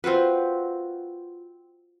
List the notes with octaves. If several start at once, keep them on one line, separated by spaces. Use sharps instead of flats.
C4 F4 F#4 B4